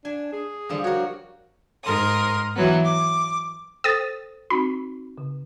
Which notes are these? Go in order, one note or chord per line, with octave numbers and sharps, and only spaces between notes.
D4 G#5
G#4
D3 F3 G3
F#4 A#4 C#5
G#2 A#4 C6 D#6
E3 F#3 B3
D6
A4 C5 G5 D#6 A6
C4 D#4 F#4 B5
C#3